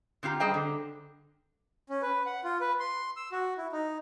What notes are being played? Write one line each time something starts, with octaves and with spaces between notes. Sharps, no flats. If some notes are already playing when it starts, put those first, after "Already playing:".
D3 C4 F4 G4 A#5
G3 G#4 C5 D#5 G5 A#5
D3
C#4
B4
F#5
F4
B4
C6
E6
F#4
E4
D#4